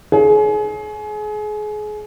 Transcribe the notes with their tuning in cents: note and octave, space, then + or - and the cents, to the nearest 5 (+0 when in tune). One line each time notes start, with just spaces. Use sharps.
G#4 +30 C#5 +0